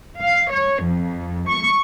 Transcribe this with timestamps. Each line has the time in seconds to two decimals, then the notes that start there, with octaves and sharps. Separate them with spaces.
0.22 F5
0.53 C#5
0.85 F2
1.49 C#6